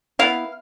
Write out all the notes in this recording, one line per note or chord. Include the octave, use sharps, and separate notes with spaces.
B3 E4 F5